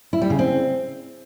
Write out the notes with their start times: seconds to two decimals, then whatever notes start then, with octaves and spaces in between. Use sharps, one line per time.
0.13 E4
0.22 G3
0.30 C#3
0.39 C4